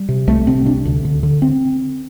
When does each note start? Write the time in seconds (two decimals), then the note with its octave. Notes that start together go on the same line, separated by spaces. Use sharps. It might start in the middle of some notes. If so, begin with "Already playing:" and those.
Already playing: G3
0.09 C3
0.27 C2 A3
0.47 C3 C4
0.66 C3 D4
0.85 D2
1.05 D3
1.23 D3
1.42 C4